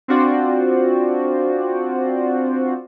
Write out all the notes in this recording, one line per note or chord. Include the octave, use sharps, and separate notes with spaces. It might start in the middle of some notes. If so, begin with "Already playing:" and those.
C4 D4 F4 F#4 C5 D5